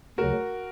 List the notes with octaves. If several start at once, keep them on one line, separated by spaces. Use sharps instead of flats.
D2 C#3 F#3 F#4 A#4